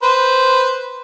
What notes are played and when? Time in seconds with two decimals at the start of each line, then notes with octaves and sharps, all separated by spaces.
0.03 B4 C5